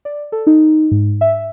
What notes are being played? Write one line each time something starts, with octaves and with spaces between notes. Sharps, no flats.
D5
A4
D#4
G#2
E5